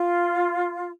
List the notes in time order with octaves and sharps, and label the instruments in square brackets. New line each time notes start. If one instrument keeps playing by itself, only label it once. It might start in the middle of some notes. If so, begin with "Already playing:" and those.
Already playing: [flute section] F4